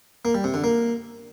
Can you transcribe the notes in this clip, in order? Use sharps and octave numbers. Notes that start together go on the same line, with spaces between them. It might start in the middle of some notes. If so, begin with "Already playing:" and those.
A#3
G3
C3
D3
A#3